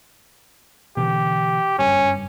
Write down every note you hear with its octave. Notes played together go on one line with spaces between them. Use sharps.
B2 D3 E3 G4
F#1 G2 C#4